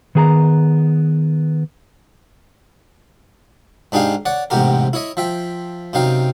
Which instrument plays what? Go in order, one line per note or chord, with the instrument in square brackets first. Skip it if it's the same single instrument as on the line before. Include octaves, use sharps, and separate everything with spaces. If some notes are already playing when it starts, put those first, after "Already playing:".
[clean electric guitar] D#3 B3 G#4 G5 A#5
[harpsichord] G#2 D4 D#4 G4 G#4 F5
C#5 D5 F#5
A1 G#2 C3 B3 G4 A#4
E4 C#5 D#5
F3 E5 G5
F#2 C3 D#4 F5 G5